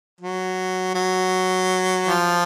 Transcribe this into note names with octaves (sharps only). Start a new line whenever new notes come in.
F#3
F#3
F3